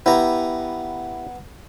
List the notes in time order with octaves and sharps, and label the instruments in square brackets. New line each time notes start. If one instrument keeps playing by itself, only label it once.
[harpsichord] B3 A#5 [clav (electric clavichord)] E4 G4